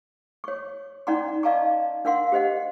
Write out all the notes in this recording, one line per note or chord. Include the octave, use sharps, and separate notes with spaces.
C#5 C#6
C#4 D#4 D5 F#5 A#5 C6
D5 D#5 F5 A5 A#5 C#6
D4 A#4 F5 F#5 C6
G4 C5 D#5 F#5